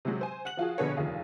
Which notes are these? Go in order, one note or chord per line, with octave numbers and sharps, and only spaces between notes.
C3 F#3 G#3
C5 G#5
F#5 F#6 F#7
F3 F4 F#4 G#4
A#1 B2 D3 B3 G#4 C#5
F1 D#2 F4 G#4